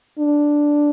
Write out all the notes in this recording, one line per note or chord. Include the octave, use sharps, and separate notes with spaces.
D4